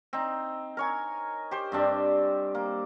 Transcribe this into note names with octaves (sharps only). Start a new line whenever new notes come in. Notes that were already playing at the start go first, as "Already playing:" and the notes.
C4 D#4
A#4 C#5 G#5
G4 C5
G2 C4 D4 G4
A#3